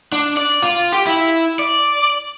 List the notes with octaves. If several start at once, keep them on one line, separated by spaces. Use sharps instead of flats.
D4
D5
F4
G4
E4
D5